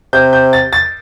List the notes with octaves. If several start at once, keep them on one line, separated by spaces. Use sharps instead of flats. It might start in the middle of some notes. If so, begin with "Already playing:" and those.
C3 G6
G6
A6
A6